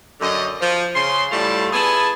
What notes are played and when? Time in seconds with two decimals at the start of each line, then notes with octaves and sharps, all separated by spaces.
0.20 F#2 D3 D#5
0.61 F3
0.95 C#3 C6
1.31 A2 G3 A3 F4 D5 A5
1.73 B3 E4 G#4 G#5 A5